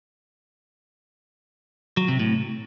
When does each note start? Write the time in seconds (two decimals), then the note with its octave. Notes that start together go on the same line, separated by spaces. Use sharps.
1.97 F#3
2.08 C3
2.19 A2